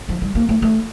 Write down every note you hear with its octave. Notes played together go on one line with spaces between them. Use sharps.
F3
G3
A#3
A3
A3